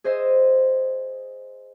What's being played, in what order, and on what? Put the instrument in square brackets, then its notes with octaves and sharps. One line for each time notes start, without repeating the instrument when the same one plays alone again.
[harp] G#4 C5 D#5 E5